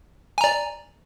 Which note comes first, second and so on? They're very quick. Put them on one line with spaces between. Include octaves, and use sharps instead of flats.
G#5 A#5 D5